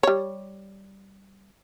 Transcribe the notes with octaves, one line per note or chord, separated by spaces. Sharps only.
G3 C#5